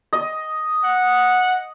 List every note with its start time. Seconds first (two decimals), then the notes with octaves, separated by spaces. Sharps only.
0.13 D#5
0.84 F#5